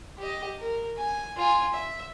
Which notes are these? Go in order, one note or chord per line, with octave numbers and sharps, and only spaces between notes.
G4 D#5
A#4
G#5
F4 G#5
E5